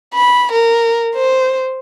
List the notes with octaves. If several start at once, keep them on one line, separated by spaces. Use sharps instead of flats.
B5
A#4
C5